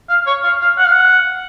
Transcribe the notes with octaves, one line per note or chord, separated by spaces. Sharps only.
F5
C#5
F5
F5
F#5
F5
F#5